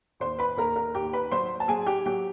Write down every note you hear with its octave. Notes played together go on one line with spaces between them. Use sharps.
D#2 C5 C6
B4 B5
D#2 A#4 A#5
A#4 A#5
D#2 G4 G5
B4 B5
F#3 C5 C6
A5
F#3 G#4 G#5
G4 G5
F#3 G4 G5